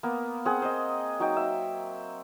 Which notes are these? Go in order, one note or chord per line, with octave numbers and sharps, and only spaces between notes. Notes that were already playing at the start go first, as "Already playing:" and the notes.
A#3 B3
C4 G#4 F#5
C5 D#5
F#3 D#4 G5
E5